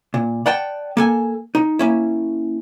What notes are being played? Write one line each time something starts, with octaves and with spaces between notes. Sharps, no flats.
A#2
D5 F#5 G5 A5
A#3 A4 G#5
D#4
A#3 C#4 E4